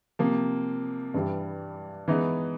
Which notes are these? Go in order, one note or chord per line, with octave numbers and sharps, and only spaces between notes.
C3 F3 A#3
G2 E3 G3
E3 G#3 B3 D#4